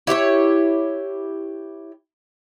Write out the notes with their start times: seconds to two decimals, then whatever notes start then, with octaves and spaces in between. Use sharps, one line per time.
0.07 E4 G4 B4 C#5